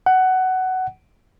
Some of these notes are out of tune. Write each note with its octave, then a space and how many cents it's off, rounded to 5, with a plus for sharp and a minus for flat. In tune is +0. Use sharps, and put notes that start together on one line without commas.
F#5 +15